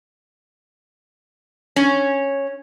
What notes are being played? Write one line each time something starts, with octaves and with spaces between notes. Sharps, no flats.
C#4